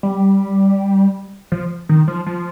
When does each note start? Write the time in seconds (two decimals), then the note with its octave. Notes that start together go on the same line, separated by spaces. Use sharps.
0.03 G3
1.52 F3
1.89 D#3
2.08 F3
2.27 F3